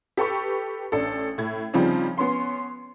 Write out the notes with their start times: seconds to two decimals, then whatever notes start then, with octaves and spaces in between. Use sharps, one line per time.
0.17 G4 A4 B4 C#6
0.92 A1 D4 A4
1.38 A2 G#6
1.74 C#3 F3 G3 C4 D#4
2.18 B3 C#4 C6